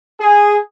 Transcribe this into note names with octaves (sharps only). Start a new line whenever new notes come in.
G#4